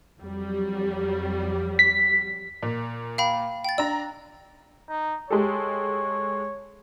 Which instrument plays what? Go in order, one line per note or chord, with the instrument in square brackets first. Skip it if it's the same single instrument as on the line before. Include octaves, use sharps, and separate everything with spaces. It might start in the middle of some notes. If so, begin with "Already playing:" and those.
[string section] F2 F#3 G3
[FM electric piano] B6
[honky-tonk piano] A#2
[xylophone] F5 G5 B5
G5 A6
[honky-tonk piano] D4 A#5 [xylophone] E6
[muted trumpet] D#4
[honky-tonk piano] G#3 G4 A4 [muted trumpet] C#5